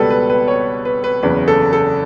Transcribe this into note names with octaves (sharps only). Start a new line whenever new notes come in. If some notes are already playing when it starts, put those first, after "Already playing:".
Already playing: C#2 B2 G3 A4 B4
B4
B4
C#5
B4
B4
F#1 E2 C#3 B4
A4
A4